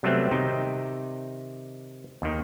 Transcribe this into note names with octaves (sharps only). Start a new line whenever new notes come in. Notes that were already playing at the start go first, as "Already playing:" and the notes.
C3 F#3 G3 A3 B3 C4
C3 D#3 D#4 G5
D#2 D#3